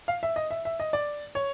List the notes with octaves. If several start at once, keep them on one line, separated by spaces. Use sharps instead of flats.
F5
E5
D#5
E5
E5
D#5
D5
C#5